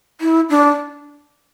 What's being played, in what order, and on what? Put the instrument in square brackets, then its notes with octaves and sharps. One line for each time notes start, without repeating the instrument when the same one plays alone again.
[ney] E4
D4